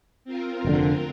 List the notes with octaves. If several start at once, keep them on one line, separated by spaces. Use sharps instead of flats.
C4 F4 A#4
F1 B2 D3